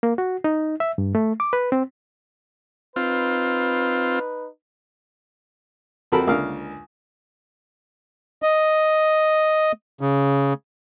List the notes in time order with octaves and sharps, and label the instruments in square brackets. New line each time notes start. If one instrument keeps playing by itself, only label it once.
[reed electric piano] A#3
F#4
D#4
E5
G2
A3
D6
B4
C4
[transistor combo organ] C4 F4 [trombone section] D#4 B4
[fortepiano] F2 C4 F#4 A4 A#4 B5
C#2 D3 A#3 A#4 F5 F6
[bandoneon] D#5
C#3